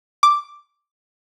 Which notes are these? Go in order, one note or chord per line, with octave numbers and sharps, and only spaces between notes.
D6